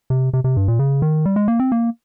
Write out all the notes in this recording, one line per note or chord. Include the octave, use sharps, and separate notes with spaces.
C3
C3
C3
G2
A#2
C#3
D#3
G3
G#3
A#3
C4
A#3